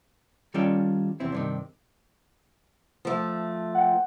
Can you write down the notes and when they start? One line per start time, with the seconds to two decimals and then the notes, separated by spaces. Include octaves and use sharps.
0.54 D#3 G3 C#4 F4 A4 G5
1.20 E2 C3 C4 E4
1.32 G2 C3 D#3
3.05 F3 A3
3.75 F#5 G5